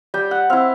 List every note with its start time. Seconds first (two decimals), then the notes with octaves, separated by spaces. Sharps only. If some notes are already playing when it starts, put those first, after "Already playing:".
0.14 G3 G5
0.31 F#5
0.50 C4 E4 F5